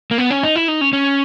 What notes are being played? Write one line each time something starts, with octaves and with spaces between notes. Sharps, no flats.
A#3
B3
C#4
D#4
E4
D#4
C#4
C#4